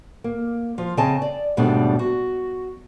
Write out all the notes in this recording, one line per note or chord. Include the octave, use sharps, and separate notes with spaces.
A#3
F3 F4
C#3 C4 G#4 D#5 G#5 A5
D5
D#2 G#2 B2 G3 A3 D4
F#4